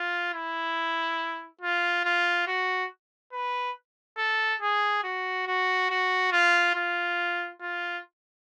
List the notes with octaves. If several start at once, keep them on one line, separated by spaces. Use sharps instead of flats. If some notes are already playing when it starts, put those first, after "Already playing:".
Already playing: F4
E4
F4
F4
F#4
B4
A4
G#4
F#4
F#4
F#4
F4
F4
F4